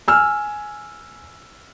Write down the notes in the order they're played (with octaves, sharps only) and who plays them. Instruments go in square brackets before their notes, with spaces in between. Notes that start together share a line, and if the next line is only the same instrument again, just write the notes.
[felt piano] G#5 E6 F6